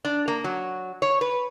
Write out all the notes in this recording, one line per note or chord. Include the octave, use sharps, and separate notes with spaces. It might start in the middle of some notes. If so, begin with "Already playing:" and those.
D4
A#3
F#3
C#5
B4